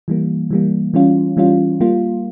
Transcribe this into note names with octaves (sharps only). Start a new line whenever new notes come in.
E3 G3 A#3
E3 G3 A#3
E3 G3 C#4 F4
E3 G3 C#4 F4
G3 A#3 F4